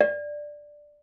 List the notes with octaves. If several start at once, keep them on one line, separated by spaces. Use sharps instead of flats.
D5